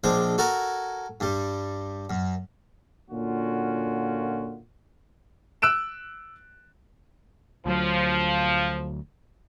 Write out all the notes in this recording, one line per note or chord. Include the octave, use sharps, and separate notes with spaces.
A#1 G#3 D4 C5
F#4 A4 A#4 G#5
G2 G3
F#2
A#2 D3 A#3 C#4 F4 F#4
E6 F#6 D7 E7
D2 F3 F#3